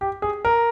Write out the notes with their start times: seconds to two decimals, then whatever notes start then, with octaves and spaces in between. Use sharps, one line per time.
0.01 G4
0.22 G#4
0.45 A#4